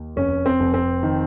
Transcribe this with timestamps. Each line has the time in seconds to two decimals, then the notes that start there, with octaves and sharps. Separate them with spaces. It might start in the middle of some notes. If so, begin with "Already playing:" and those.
Already playing: D#2
0.16 F1 C#4
0.46 C4
0.60 F1
0.74 C4
1.03 D#3